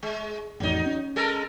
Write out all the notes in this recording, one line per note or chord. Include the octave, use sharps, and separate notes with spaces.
G#3
A1 F2 F#3 D#4
C#4
G#3 A4 A#4